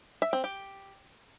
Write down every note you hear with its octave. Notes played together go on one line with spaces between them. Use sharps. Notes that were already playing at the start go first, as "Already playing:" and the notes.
E5
C4
G4